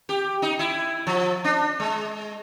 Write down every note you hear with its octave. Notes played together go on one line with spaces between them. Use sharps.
G4
D#4
E4
F3
D4
G#3